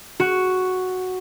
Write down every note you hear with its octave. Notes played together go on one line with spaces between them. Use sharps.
F#4